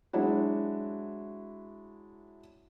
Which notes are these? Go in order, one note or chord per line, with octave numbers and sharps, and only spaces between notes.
F#3 G#3 D4 E4 F#4